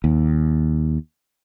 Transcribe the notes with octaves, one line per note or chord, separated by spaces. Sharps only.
D#2